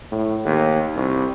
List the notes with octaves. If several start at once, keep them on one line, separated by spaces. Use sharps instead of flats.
A2
D#2
C2